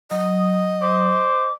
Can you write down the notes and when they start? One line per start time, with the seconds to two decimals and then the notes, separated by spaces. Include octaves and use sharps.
0.11 F#3 D#5 D#6
0.82 C5 D6